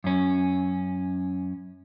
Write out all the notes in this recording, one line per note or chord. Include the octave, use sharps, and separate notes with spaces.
F#2 C#4